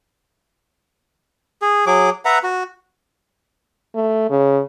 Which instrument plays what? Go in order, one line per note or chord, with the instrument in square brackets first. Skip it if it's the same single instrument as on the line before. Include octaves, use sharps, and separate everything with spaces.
[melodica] G#4
F#3 G#4 D6
B4 E5 F#5 A#5
F#4
[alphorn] A3
C#3